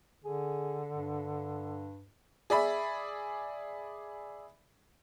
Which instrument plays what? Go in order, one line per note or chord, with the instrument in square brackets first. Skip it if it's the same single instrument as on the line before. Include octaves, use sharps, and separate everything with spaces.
[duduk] D3 [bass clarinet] G#4
[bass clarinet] G2
[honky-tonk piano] G#4 D5 E5 B5